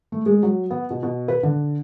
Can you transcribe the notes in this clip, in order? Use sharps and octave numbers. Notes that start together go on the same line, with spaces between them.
A3
G#3
F#3
B3
B2
B2
B4
D3